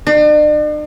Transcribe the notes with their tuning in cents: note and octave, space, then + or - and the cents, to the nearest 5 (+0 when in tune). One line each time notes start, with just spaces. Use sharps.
D4 +45